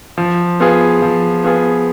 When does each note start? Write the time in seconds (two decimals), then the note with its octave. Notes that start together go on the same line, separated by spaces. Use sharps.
0.18 F3
0.60 B3 F4 G#4
1.02 F3
1.44 B3 F4 G#4